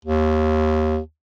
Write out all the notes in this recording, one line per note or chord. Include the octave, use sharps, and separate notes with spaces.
D#2